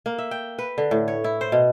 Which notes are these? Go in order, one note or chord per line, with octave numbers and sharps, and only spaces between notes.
A#3
E5
G5
B4
D3
A2
C#5
E4
C5
B2